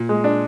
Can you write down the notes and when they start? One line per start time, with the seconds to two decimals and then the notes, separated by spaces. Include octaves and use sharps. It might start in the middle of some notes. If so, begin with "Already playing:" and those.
Already playing: A#2
0.09 G#3
0.24 D4